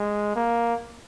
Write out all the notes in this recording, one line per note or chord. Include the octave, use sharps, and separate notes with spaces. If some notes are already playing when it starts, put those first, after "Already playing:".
Already playing: G#3
A#3